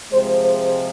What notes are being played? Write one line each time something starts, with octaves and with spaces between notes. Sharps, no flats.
C3 F3 G#3 C5
C5